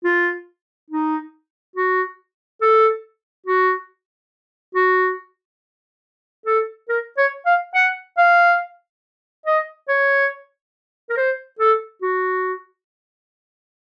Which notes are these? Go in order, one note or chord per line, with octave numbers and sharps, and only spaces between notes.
F4
D#4
F#4
A4
F#4
F#4
A4
A#4
C#5
F5
F#5
F5
D#5
C#5
A#4
C5
A4
F#4